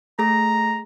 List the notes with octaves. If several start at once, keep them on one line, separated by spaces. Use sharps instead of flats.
A3 G#4 A#5 A#6